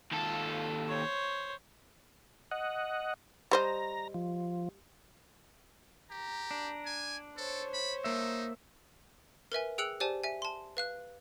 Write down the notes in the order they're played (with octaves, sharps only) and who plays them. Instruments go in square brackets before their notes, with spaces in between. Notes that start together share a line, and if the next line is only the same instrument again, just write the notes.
[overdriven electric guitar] D#2 A4 [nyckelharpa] F4
[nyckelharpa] C5 C#5
[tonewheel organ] D#5 F#5
[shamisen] G3 C5 D#5 [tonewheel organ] A#5
[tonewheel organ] F3
[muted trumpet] G4 [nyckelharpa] A#5
[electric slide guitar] D4
[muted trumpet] G#5
[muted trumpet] A4 [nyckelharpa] C5 C#5
[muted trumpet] B5
[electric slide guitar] A#3 E5 [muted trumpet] D#4
[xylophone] A#4 B4 E5 G#5
G#4 G5 E6 F#6 C#7 F#7
G4 C5 D5 G#5 A5
E5 G#5
A5 C6
B4 F5 F#6